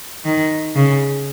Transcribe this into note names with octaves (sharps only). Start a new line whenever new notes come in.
D#3
C#3